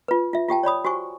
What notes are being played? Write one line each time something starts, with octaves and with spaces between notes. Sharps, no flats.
F4 B4
F4 E5
F4 G4 G5 A5
C#5 D5 B5 D#6
F#4 G4 C5 G#5 C#6